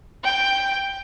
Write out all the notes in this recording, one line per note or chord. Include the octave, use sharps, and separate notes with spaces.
G5